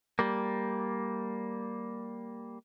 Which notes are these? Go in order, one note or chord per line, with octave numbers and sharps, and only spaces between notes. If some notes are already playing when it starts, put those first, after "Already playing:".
G3 A#3